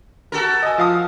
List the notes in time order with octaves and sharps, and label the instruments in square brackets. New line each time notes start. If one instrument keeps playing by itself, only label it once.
[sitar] F#4 A4 A#4
[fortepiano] D#5 G#5
F3 F5 D#6